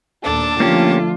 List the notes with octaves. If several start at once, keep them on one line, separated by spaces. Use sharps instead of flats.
D#2 A#2 A3 D4 A4 A5
D3 F3 A3 A#3 C#4 F4 G4